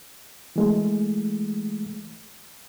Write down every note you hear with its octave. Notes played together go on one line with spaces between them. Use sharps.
E3 G#3 A3